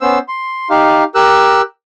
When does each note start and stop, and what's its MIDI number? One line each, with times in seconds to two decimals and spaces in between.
0.01 0.18 59
0.01 0.18 61
0.01 0.18 72
0.01 0.18 88
0.28 0.68 84
0.70 1.04 63
0.70 1.04 67
0.70 1.04 77
1.15 1.62 67
1.15 1.62 70
1.15 1.62 88
1.15 1.62 90